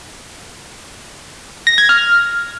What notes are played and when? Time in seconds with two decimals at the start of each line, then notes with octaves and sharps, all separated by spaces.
1.67 A#6
1.78 G#6
1.89 F6